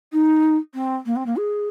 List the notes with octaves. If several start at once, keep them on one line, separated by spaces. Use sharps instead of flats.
D#4
C4
A#3
C4
A#3
G#4